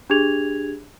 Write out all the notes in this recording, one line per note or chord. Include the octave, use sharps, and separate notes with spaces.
D4 G4 G#4 G#6 F7